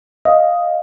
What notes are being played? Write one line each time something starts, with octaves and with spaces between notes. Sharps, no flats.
D#5 F5